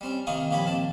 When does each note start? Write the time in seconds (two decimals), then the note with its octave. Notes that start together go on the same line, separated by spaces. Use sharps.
0.01 G3 C4 C#4
0.27 C3 D#3 A#3 F4 C#6 D#6
0.51 A#2 F3 G4 C#5 B5
0.66 D#2 C4 A5